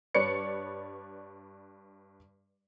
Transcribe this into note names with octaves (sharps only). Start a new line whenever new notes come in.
G2 B4 C#5 D5 C#7